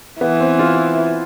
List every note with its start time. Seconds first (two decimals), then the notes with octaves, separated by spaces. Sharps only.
0.21 E3 B3
0.40 C4
0.59 F4